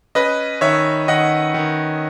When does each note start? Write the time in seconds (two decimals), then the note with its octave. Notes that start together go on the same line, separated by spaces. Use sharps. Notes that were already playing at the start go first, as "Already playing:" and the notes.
0.15 C#4 B4 D#5
0.61 D#3 C#5 E5
1.08 D#3 D#5 F#5
1.54 D#3